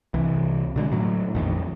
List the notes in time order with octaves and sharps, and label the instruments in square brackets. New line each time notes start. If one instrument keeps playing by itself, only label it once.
[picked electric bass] C2 E3
B2 D3 G#3
A2 F#3
A#1 F2 D#3